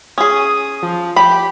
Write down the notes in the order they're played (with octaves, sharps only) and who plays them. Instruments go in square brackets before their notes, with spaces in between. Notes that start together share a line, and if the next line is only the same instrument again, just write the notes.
[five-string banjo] C#4 G#4 [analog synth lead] D#6
[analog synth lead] F3
[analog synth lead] G4 [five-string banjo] B5